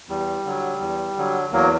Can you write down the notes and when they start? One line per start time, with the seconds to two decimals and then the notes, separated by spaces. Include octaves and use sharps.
0.09 E2 G3
0.45 D3 F#3
0.80 E2
1.17 D3 F#3
1.52 E2 F#3 A#3